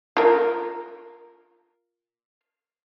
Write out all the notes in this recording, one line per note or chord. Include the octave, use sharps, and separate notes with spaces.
F4 A#4